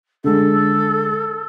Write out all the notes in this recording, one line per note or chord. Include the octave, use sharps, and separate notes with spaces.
D3 G#3 A4